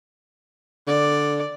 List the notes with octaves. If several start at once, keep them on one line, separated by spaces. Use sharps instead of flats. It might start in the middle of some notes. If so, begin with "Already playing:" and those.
D3 D5